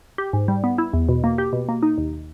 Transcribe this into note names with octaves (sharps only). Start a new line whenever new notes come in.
G4
G#2
G3
B3
E4
E2
B2
A#3
G4
B2
A#3
D#4
D#2